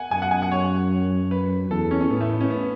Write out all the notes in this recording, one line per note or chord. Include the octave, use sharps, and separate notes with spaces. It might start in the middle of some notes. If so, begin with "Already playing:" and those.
Already playing: F#5 G#5
F#2 G#5
F#5
G#5
F#5
C#5
B4
E2 A4
C#4
C#4
A2 B3
A3
B3
C#4
B3